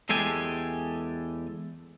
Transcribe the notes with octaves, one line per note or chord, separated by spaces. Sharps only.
E2 G#3 G4 A4 G#5